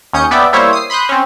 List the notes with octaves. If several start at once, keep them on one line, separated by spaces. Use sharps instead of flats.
D#2 C#4 D#6 G6 C#7
B3 D5 E5 G5
G3 A#3 E4 C5 C#5 E5
D#6 C7
B5 C6 D#6 F#6 G6
C4 C#4